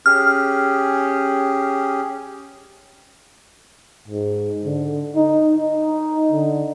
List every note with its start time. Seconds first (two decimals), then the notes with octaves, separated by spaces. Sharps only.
0.06 C#4 G4 G#4 F6
4.08 G#2
4.65 D3
5.15 D#4
5.57 D#4
6.32 D3